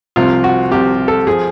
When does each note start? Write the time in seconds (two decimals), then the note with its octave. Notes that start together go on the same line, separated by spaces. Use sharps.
0.16 C2 C3 F3 F4
0.44 F#4
0.72 C2 C3 F3 G4
1.08 A4
1.27 F3 G#4